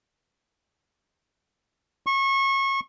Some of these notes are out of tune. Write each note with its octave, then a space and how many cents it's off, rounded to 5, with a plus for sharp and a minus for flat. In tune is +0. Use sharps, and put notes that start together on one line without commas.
C#6 -25